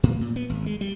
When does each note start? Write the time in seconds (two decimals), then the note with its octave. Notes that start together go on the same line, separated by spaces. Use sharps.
0.03 A2
0.21 A#2
0.36 B3
0.49 G#1
0.66 G#3
0.81 G3